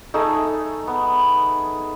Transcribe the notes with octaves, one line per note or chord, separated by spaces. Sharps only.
A3 D#4 G#4
B3